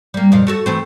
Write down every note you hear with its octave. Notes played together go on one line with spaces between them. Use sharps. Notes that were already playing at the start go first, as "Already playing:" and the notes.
G3 A#3
F2 A#2 F5
A3 F#4 A4
E3 A3 C4